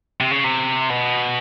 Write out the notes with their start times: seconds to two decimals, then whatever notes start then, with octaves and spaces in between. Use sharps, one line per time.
0.21 C3
0.31 C#3
0.44 C3
0.90 B2